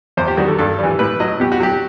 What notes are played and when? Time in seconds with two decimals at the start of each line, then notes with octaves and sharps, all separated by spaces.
0.17 E2 C5
0.28 G4
0.37 D#3 G3 F#4
0.48 A4
0.59 G2 A4
0.79 E3 G3
0.99 A2 B4
1.20 F#3 D#5
1.40 B2 G4
1.52 F#4
1.60 F#3 G4